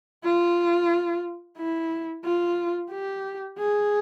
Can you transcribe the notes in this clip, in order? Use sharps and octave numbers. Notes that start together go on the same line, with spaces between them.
F4
E4
F4
G4
G#4